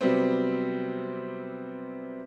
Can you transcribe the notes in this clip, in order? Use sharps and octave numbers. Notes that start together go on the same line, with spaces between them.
C3 F#3 G3 B3 C4